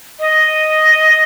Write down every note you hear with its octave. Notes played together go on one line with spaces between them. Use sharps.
D#5